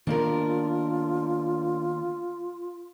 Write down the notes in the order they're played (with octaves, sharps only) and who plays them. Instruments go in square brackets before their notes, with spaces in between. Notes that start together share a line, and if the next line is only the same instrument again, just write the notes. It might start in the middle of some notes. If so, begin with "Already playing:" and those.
[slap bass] D#3 A#3 B3 [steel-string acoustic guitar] D4 A#4 [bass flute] F4